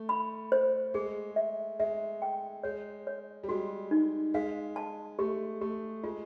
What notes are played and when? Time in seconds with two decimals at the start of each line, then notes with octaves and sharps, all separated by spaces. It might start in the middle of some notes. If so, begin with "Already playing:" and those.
Already playing: A3
0.09 B5
0.52 C5
0.94 G#3 G#4
1.36 E5
1.79 G#3 E5
2.22 G5
2.63 G#3 C#5
3.07 C#5
3.44 G3
3.49 G#3 F#4
3.91 D#4
4.34 G#3 F5
4.76 A5
5.19 A3 G4
5.61 A3 G4
6.04 G#3 F4